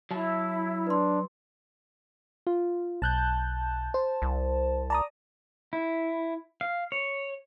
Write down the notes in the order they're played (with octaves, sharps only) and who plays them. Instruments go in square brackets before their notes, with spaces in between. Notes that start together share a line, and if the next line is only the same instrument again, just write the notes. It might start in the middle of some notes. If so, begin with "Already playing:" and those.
[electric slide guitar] F#3 A5 [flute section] E4
[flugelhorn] D4 [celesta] B4 C6
[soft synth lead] F4
[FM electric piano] B1 F#6 G6 [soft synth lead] A5
[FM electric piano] C5
[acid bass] C2
[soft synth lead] D5 [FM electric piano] A5 A#5 D#6
[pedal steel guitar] E4
F5
C#5